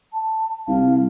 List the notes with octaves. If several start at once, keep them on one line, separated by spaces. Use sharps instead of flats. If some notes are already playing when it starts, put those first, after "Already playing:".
A5
C2 F5